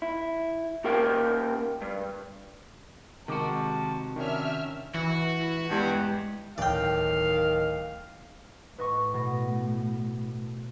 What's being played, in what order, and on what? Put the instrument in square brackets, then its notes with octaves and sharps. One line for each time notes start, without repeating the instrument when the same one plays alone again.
[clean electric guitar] E4
A#3 C#4 G4 A#4 F5 G5
G2
[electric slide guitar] C3 F#4 [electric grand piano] D#3 G#3 D6 [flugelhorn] A5
[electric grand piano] D#3 C#4 [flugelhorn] D4 [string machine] E5 F6
[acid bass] E3 [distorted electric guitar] F#4
[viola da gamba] E4
[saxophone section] E2 G2 [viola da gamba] G#3 G4
[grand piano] D1 F6 [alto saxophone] D#3 [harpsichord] D5 G5 [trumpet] F5
[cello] A2 [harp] B4 D#5 C#6
[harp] B2 A#6